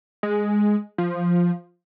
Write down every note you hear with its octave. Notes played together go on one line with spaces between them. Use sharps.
G#3
F3